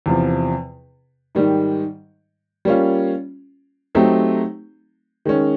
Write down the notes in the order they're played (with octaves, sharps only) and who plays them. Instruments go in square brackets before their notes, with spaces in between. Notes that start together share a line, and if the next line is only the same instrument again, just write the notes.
[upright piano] E2 C3 F3
G#2 D#3 G3
G3 A#3 C#4 F4
F#3 A3 C4 D#4 G4
D#3 G#3 C#4